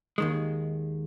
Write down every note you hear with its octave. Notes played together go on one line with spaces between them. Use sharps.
D#2 D#3 G#3